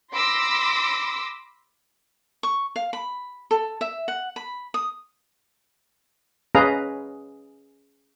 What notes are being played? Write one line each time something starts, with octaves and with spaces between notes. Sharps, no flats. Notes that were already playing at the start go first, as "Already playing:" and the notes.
B5 C6 D6 E6 A#6 B6
C#6
F5
B5
A4
E5
F#5
B5
D#6
C#4 G#4 B4 D#5 F5 A#5